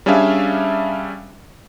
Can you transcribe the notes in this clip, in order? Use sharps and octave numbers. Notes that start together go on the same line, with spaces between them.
G3 C#4 D4 G#4 E5 F5